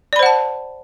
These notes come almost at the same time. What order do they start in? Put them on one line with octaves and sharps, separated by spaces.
D5 B5 C5 F#5 A5